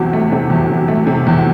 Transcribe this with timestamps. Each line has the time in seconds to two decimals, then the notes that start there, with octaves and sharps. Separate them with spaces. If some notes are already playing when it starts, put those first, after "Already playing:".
Already playing: E2 C3 F#3 F#5
0.13 A3
0.32 C3
0.50 E2
0.70 F#3
0.88 A3
1.07 C3
1.27 E2